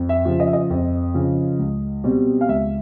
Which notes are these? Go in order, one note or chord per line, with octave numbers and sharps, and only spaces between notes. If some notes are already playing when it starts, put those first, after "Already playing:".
Already playing: F2
E5
C#3 F3
D#5
E5
D#5
F2
C#3 F3
C#2
B2 G3 C4
F5
C#2 E5